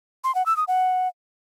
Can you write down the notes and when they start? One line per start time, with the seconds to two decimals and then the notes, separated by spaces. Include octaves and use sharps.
0.24 C6
0.35 F#5
0.46 E6
0.57 D#6
0.68 F#5